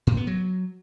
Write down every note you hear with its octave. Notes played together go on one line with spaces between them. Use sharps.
A2
B3
F#3